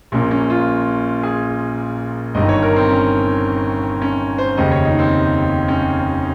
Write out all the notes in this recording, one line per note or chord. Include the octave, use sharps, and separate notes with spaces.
A#1 A#2 C#4
C#4
F4
G#4
G1 G2 D#3 D#5
C#5
A#4
C4
C#4
C#4
C5
F1 D#2 C#3 D#5
C#5
D#4
C4
C#4